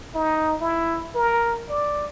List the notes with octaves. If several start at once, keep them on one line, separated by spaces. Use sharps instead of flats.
D#4
E4
A#4
D5